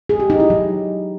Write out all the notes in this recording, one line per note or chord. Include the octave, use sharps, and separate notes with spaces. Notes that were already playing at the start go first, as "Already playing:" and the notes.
G#4
G4
D#4
E4
F#3